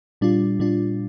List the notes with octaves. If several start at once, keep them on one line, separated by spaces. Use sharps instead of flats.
A#2 G3 D4 F4
A#2 G3 D4 F4